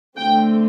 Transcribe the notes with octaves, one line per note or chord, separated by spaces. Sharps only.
D3 A3 C4 G5